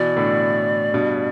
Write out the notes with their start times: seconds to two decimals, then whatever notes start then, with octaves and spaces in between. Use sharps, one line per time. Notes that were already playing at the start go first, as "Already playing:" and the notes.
Already playing: B2 E3 D5
0.16 A2 D3
0.94 G2 B2